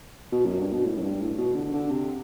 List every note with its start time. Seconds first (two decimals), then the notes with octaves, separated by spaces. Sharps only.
0.32 B2
0.45 F#2
0.59 G2
0.72 B2
0.85 A2
0.97 F#2
1.03 G2
1.21 A2
1.38 B2
1.55 D3
1.73 D3
1.91 C3